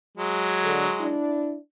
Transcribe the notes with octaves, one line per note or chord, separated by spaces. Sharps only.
F#3 G#3
D3
D4 E4